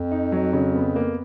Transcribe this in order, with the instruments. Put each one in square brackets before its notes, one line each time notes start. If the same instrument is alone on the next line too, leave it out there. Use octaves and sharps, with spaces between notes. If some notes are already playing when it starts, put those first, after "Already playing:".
Already playing: [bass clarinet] F2
[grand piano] D#4
F#3
C#3
B3
A#3